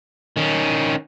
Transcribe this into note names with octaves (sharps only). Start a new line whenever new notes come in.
D#3 C#4